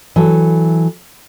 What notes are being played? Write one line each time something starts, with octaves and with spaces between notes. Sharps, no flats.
E3 F#3 A4